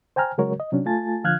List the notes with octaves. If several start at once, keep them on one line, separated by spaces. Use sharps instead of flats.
C5 G5 G#5 A#5 F6
C#3 F#3 G#3 F#4 A#4 C#5
D#5
C3 F#3 C#4 D4
A3 F4 G#5 A5 A6
D3 F3 F5 F6 F#6 G#6